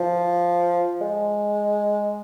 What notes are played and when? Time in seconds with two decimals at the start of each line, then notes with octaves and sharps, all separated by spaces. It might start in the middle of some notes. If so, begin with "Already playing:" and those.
Already playing: F3
1.01 G#3